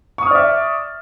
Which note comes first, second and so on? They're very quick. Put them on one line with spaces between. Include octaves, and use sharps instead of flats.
C#6 D#6 F6 D5 E5